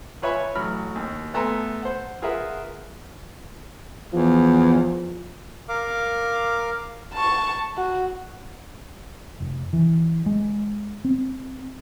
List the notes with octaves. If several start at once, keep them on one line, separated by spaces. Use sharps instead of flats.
F4 B4 C#5 E5 G#5 B5
A1 F#3 B5 F6
D#2
A3 B3 A4 G#5 A#5 C6
C5 F#5
F4 G#4 A#4 B4 E5 F#5
E2 F3
A#4 F5 D6
A5 C#6
F#4
F1
E3
G#3
C4